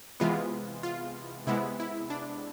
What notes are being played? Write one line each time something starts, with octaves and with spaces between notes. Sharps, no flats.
C3 E3 G#3 B3 F4
F4
C3 G#3 B3 E4
E4
D4